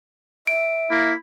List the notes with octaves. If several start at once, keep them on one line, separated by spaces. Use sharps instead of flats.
E5 D7
A#3 E4